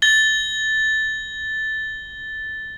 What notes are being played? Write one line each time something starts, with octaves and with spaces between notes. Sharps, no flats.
A6 G7